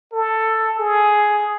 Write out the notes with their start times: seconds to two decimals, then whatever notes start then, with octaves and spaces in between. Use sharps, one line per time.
0.13 A4
0.79 G#4